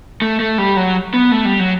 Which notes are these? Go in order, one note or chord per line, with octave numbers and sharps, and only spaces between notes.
A3
A3
G3
F#3
B3
A3
G3
F#3